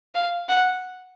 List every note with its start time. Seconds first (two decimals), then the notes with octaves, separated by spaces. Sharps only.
0.15 F5
0.49 F#5